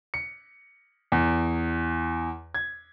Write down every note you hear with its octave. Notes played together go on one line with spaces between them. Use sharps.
C#7
E2
G#6